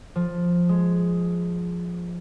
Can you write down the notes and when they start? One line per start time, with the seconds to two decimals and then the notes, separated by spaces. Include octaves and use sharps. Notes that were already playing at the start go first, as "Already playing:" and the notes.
0.16 F3
0.69 G#3